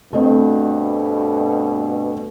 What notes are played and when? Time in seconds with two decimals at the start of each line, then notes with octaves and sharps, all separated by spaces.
0.13 G2 B2 A3 C4 D#5